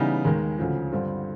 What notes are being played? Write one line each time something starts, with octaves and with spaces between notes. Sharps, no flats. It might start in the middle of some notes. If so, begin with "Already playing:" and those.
Already playing: C#3 E3 G3 B3 D#4
D#2 D#3 G#3
D2 C#3 F3
G2 D3 G3 C4 F4